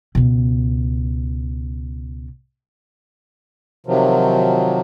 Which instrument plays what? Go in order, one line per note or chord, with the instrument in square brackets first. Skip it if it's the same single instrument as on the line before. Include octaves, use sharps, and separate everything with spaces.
[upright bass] C#2 B2
[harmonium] C3 D#3 F3 F#3